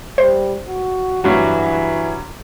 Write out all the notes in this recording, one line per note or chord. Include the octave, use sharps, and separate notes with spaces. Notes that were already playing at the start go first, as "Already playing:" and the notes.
G3 C5
F#4
G2 E3 F#3 F#4